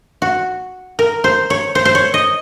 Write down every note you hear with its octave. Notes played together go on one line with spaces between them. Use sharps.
F#4
A#4
C5
C#5
C5
C5
C#5
D#5